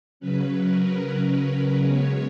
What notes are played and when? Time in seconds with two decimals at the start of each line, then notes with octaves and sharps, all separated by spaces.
0.20 C#3 F#3 C#4 B4
0.61 A#4
1.02 B4
1.83 C#3 G#3 B3 C#5